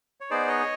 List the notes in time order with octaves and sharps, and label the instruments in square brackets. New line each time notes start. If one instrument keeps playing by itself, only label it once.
[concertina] C#5
B3 D#4 G#4 C5 D5
C#5 D#5